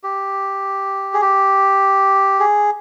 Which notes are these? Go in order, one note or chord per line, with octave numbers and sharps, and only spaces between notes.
G4
G#4
G4
G#4